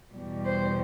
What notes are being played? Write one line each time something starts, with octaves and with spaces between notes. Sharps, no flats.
E2 B2 G3
C5